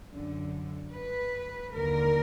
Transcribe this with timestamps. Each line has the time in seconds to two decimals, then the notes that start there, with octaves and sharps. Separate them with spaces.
0.11 F#2 D3
0.93 B4
1.74 D#2 D3 A#4